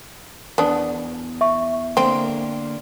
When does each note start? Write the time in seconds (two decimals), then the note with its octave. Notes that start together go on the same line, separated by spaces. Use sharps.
0.58 E2 B3 D4
1.41 E5 C#6
1.97 D3 A#3 C4 A#4